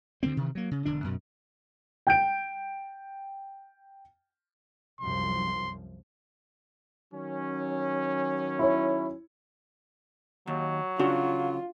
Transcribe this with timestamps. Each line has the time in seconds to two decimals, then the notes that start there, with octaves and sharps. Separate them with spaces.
0.23 D2 D3 A#3 C4
0.37 C3 D#3 E3
0.55 F#3 A#3
0.71 C#3
0.85 E1 D3 D4
1.04 F#2 B2
2.07 G5 G6 D7
5.01 C2 F#2 F3 C6
7.13 D#3 F#3 C#4
8.59 E4 C#5
10.47 D#2 F#3
10.99 C#3 D4 F4 F#4 C#6